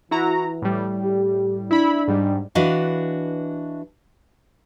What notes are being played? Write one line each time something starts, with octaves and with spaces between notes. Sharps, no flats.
E3 E4 F#4 A#5
A2 G3
G4
D4 E4 B5
G#2 G3
E3 D4 F#4 B4 D#5 F5